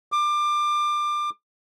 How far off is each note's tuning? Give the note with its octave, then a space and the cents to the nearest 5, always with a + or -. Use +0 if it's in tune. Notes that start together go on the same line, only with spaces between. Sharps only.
D6 +25